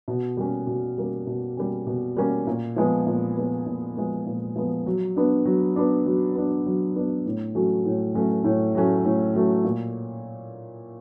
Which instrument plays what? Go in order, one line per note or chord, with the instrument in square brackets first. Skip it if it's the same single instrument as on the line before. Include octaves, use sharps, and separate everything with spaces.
[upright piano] B2
G3 A#3 C#4
B2
G3 A#3 C#4
B2
G3 A#3 C#4
B2
G3 A#3 C#4
A#2
F3 G#3 B3
A#2
F3 G#3 B3
A#2
F3 G#3 B3
A#2
F3 G#3 B3
F#3
B3 D4
F#3
B3 D4
F#3
B3 D4
F#3
B3 D4
A2
F#3 A3 C#4 F#4
A2
F#3 A3 C#4 F#4
A2
F#3 A3 C#4 F#4
A2
F#3 A3 C#4 F#4
A#2